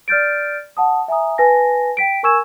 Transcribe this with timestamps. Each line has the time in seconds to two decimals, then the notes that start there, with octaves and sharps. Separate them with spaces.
0.08 D5 F6 G6 A6 D7
0.77 F#5 A5 D#6
1.08 E5 G#5 A#5 D#6
1.38 B4 G#5 A5 A#6
1.97 G5 B6 D7
2.23 A#4 G#5 C#6 E6 G#6 E7